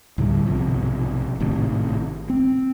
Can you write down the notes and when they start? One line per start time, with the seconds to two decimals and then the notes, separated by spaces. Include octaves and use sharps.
0.18 D2 A2 D3 G3
0.46 B1 G#2 C3 F3
1.40 G#1 A2 C3 D#3
2.30 C4